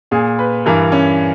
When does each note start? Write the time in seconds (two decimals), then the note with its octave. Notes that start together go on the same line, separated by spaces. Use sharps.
0.11 A#2 G#4
0.39 B4
0.66 G2 E3 A#4
0.92 C#4